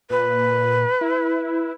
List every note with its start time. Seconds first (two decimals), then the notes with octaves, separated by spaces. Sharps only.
0.10 A#2 B4
1.01 E4